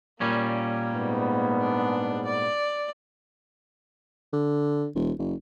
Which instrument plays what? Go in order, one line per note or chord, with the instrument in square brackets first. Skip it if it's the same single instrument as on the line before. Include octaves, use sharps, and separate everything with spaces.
[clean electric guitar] A#2 G3 C#4 [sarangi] A#3
[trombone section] G#2 B3
[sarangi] D4
D5
[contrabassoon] D3
E1
F#1